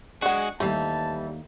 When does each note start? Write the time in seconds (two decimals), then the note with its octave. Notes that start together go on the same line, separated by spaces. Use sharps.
0.22 G#3 D4 F#4 G#4 F#5
0.60 D#2 E3 G3 A3 E4 A5